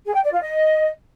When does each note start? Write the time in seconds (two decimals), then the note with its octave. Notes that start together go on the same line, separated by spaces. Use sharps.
0.05 G#4
0.14 G5
0.23 D5
0.32 F4
0.41 D#5